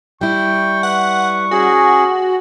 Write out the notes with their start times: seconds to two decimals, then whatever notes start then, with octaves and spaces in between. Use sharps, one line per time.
0.21 G3 E4 G5 C#6
0.83 B4 F#5
1.51 C#4 F#4 G#4